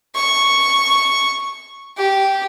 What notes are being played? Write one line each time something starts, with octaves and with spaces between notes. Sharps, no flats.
C#6
G4